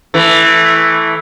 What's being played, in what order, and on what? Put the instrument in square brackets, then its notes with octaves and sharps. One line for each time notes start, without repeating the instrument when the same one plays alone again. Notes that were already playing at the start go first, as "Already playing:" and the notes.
[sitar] E3 A3